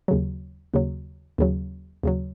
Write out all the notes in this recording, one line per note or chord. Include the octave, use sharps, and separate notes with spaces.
D#2 C#3 F#3
D#2 C#3 F#3
D#2 C#3 F#3
D#2 C#3 F#3